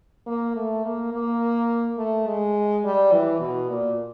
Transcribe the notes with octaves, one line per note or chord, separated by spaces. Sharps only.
A#3
A3
A#3
A#3
A3
G#3
G3
E3
B2
A#2